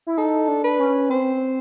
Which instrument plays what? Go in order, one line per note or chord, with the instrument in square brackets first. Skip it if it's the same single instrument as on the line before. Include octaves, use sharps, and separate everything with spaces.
[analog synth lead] E4
[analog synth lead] D#4 [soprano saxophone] A4
[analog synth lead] D4
[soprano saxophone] B4
[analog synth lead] C#4
[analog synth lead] C4 [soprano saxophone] C5